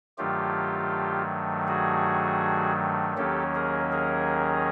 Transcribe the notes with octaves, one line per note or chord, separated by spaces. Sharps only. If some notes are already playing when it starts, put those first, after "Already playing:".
G2 D#3 F#3 A3 F4 G4
F#4 G#4
D#2 D#3 F#3 A#3 C#4 G4 A4
G#4 A#4
G#4 A#4